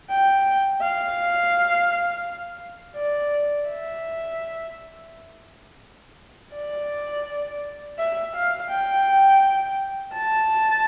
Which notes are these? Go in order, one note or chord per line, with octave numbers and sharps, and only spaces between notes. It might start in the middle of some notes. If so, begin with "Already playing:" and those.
G5
F5
D5
E5
D5
E5
F5
G5
A5